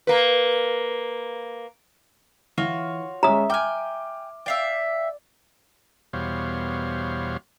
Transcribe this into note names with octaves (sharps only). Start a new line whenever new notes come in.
A#3 B4
E3 F4 F#4 C#5
G#3 C#4 E5 A#5 D#6
G5 G#5 D6 F6
D5 E5 F5 G5
E2 B2 G3 C5 C#5 F5